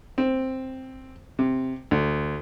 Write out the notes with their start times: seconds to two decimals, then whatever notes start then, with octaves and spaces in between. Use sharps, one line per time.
0.18 C4
1.39 C3
1.91 D2